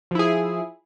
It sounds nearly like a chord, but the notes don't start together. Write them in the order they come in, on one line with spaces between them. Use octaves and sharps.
F3 E4 G#4